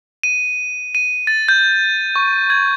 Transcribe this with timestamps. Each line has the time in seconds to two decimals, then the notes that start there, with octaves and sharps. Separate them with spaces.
0.23 D#7
0.95 D#7
1.27 A6
1.49 G6
2.16 C#6
2.50 G#6